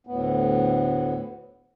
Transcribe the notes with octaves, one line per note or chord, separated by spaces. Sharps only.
D2 A2 B3